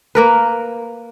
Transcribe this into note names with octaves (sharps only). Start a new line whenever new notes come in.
A#3 A#4 B4